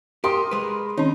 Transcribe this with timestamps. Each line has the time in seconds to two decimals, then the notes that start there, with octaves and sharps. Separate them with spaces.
0.24 G4 A#4 C6 D#6
0.51 G#3 B4
0.98 D#3 C4 C#4 D#4